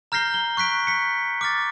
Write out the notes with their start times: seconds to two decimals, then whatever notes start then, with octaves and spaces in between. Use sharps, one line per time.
0.12 A#5 F6 G6 A#6 C7 G7
0.34 G7
0.57 C#6 F#6 B6 D7
0.87 B6 C#7
1.41 D6 F6 A6